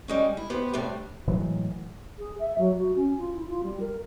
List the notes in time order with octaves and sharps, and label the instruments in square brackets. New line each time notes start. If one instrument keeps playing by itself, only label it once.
[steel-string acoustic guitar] G3 G#3 C#4
E4
B3 G4 B4 C5
A2 C3 G3 D4
[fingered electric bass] A2 E3 F#3 G#3
[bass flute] G#4
E5
F#3
F#4
C#4
F4
E4
F4
G3
A#4